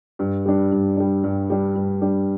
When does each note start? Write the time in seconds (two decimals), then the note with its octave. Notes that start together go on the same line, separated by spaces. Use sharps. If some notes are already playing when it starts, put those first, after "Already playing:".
0.19 G2
0.46 G3 D4
0.72 G2
0.97 G3 D4
1.24 G2
1.50 G3 D4
1.76 G2
2.02 G3 D4